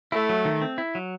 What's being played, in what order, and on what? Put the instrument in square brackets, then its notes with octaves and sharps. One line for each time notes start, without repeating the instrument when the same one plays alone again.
[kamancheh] A3 [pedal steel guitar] E4
[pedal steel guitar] F#3
D#3
C4
E4
F#3